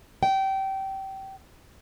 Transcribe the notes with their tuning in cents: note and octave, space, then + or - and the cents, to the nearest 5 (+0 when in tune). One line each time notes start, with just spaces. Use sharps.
G5 -25